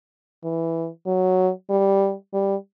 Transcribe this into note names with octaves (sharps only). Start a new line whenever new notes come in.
E3
F#3
G3
G3